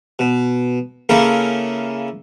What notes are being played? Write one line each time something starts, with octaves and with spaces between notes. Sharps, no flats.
B2
C#3 A#3 C#4 E4 A4 A#4